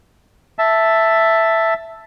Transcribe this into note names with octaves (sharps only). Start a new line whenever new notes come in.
E5 A5